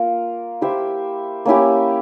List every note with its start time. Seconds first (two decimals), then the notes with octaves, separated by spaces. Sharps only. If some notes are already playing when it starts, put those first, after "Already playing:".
Already playing: A#3 F4 A#4
0.61 E4 G4 C5 E5
1.45 A#3 C#4 E4 G4